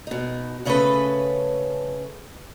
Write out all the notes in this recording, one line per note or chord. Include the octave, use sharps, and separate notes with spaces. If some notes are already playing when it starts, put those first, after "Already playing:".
B2 D#4
C#3 A3 C#4 G#4 A4 B4